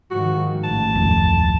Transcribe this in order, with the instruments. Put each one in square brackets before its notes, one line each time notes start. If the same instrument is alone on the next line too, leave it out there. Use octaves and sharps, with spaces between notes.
[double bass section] G#2 D#3 F3 [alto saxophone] F#4
[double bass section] A1 [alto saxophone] A5
[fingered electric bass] D1 G#1 F2